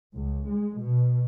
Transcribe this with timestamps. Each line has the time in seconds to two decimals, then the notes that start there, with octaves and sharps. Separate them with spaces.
0.14 C#2
0.47 G#3
0.78 B2